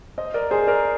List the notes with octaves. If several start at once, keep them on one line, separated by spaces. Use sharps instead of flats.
C5 D#5
A#4 D5
G#4 C5
A#4 D5